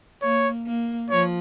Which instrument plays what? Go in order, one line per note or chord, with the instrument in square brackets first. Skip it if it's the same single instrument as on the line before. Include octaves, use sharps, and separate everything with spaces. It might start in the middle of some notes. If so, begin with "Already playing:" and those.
[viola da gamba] A#3 [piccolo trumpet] C#5
[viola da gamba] A#3
[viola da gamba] F3 [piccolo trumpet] C#5